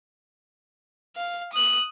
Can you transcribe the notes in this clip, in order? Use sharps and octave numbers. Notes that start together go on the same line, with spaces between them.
F5
D#6 F#6